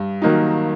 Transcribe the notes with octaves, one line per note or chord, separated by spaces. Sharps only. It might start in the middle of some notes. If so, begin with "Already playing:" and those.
Already playing: G2
D#3 F#3 A#3 D#4